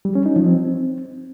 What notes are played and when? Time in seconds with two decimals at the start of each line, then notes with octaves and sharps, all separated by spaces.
0.05 G3
0.15 C#4
0.26 D#4
0.36 F3
0.46 C4